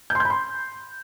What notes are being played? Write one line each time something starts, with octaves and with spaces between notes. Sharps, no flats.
G6
C6
G6
B5
C6